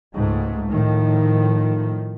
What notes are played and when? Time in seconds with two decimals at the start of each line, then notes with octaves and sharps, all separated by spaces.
0.15 C#2 G#2 A3
0.69 A2 D#3 F3